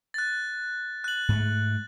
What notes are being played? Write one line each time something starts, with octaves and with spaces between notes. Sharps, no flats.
F#6 A6
F#6 F#7
G#2 A3